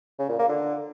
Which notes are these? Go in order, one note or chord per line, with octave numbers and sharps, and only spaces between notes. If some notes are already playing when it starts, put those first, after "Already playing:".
C#3
A#2
A#3
D3